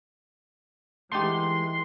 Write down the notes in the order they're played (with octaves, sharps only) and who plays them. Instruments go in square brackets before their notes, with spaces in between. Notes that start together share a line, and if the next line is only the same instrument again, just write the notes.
[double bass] E3 G#3 [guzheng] A3 D#4 G4 [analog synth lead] C6